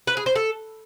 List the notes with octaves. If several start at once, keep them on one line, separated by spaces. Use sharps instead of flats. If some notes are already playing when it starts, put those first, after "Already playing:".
B4
G#4
C5
A4